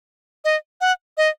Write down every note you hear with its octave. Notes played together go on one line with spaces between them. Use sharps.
D#5
F#5
D#5